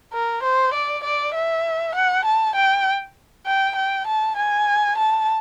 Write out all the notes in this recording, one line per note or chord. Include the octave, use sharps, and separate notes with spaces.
A#4
C5
D5
D5
E5
F#5
A5
G5
G5
G5
A5
G#5
A5